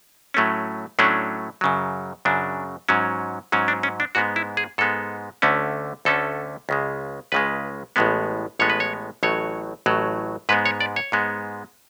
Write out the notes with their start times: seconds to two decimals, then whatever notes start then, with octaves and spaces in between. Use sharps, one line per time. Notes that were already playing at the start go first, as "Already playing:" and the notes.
0.34 A2 F#3 A3 C#4
0.99 A2 F#3 A3 C#4 D4
1.61 F#2 C#3 F#3
2.25 F#2 C#3 F#3 D4
2.89 G#2 F#3 C#4
3.52 G#2 F#3 C#4
3.68 D4
3.83 C#4
4.00 D4
4.15 G#2 G#3 B3 F#4
4.36 E4
4.57 G#4
4.78 G#2 G#3 B3 A4
5.42 D2 D3 A3 C#4
6.05 D2 D3 A3 C#4 A4
6.69 C#2 C#3 G#3
7.32 C#2 C#3 G#3 B4
7.96 A1 A2 G#3 B3
8.59 A1 A2 G#3 B3 C#5
8.70 B4
8.80 C#5
9.23 A1 A2 F#3 C#5
9.86 A1 A2 F#3
10.49 G#2 G#3 B3 B4
10.66 C#5
10.81 D5
10.96 C#5
11.12 G#2 G#3 B3